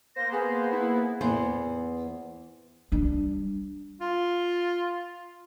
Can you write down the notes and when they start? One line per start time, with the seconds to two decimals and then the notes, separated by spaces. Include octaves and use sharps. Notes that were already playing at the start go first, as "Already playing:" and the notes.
0.16 A#3 C5 A#6
0.32 B3 G#4
0.73 E4
1.21 E2 B3 C5
2.92 G3 D4
4.01 F4